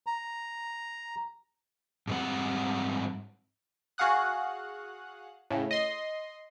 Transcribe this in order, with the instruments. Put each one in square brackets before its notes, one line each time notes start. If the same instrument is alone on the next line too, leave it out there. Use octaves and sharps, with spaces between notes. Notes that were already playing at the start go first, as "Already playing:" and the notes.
[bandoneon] A#5
[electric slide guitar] G#2 D3 G3 C4 F#5
[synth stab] F#4 G#4 F5 F#5 D#6 F#6
A2 C#3
D#5 C6